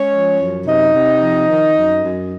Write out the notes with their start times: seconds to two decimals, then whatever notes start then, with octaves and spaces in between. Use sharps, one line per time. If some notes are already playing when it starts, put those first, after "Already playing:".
Already playing: G#3 C#4 C#5
0.12 F3
0.38 F#2
0.66 C3 D#4 D#5
0.94 C3
1.21 F3
1.49 D#3
1.77 F#2
2.05 F#2